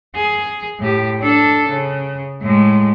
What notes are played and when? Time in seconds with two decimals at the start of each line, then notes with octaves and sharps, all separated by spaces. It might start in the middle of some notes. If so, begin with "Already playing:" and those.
0.15 G#4
0.79 A2 G4
1.20 D4 A4
1.68 C#3
2.41 A2 G#3